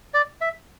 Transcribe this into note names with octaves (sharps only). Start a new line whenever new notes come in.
D5
E5